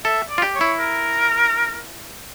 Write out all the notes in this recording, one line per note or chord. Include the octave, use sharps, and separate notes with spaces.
A4 E5
D5
F4
G4
C#5
E4
A#4